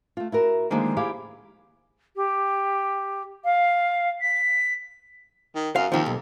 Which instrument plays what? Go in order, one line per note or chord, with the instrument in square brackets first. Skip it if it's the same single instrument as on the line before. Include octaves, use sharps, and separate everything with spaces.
[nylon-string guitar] A3 F4
E4 F#4 A#4
D3 D#3 F3 G#3 A#3
E4 G4 G#4 D5 F5
[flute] G4
F5
B6
[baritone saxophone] D#3
[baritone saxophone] F#2 [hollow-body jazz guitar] F5
[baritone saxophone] D#2 [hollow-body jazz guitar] D#3 F3
[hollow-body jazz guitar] B1